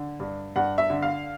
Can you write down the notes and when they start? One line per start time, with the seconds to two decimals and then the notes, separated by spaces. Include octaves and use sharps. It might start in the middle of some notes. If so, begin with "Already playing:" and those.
Already playing: D3
0.20 G2
0.56 G2 F#5
0.78 E5
0.90 D3
1.02 F5